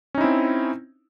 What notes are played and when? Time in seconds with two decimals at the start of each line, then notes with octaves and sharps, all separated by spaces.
0.15 C#4
0.18 D#4
0.21 E4
0.24 C4